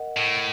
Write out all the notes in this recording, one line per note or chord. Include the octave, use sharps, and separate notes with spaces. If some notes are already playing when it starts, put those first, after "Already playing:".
Already playing: A#4 D#5 F#5
A2